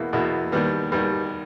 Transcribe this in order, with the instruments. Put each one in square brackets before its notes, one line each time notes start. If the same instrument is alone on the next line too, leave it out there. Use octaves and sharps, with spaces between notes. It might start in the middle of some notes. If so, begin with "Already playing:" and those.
Already playing: [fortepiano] E2 B2 A#3 E4
E2 B2 A#3 E4
D#2 D#3 G3 B3
D#2 D#3 G3 B3